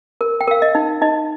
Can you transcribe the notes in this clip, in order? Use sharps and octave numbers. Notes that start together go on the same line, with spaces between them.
A#4
G5
A#4 F5
D#5
D#4
D#4 D#5